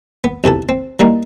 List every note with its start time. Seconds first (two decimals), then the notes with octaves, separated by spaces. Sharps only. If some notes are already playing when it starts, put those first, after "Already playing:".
0.24 B3
0.44 B1 C3 E3 A4
0.69 C4
1.00 E3 G3 A#3 D#4